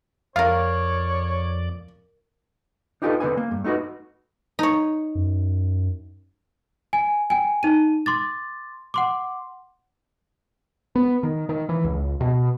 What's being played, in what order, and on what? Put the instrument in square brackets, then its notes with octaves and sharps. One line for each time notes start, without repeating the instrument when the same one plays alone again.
[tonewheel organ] F2 D5 [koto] F4 A#4 [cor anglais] C#5 [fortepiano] F5
[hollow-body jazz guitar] D4 D#4 F4 G4 A4 B4
D3 C4 B4 G#5
A#3
G2
A3 D#4 F#4 B4
[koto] D#4 C#5
[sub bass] F#2
[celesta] G#5
G5 G#5
D#4 D#7
C6 D6 A6
F#5 C6 D6
[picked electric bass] B3
D#3
D#3
E3
C#2
B2